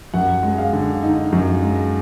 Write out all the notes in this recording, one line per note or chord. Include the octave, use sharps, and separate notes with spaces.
F#2 F#5
G#3
F5
D3
D#4
F#2
G#3